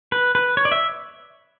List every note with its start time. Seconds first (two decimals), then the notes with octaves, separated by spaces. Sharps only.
0.12 B4
0.35 B4
0.57 C#5
0.65 D5
0.72 E5